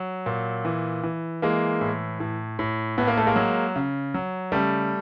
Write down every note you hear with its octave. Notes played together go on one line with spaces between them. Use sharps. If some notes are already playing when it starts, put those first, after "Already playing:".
Already playing: F#3
A#2
E3
E3
E3 G#3 A#3
A2
A2
A2
A2 B3
A#3
A3
G#3 A#3
F#3
C#3
F#3
C#3 G3 A3